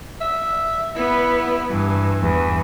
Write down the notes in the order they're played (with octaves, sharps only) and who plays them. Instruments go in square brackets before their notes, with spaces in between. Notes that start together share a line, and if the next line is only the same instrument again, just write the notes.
[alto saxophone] E5
[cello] B3 [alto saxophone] E4
[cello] G2 [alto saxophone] E3
[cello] E2 G2